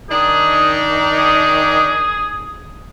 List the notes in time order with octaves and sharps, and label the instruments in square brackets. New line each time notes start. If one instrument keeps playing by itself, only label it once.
[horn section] D#3 D4 D#4 [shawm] G#4
[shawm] G#4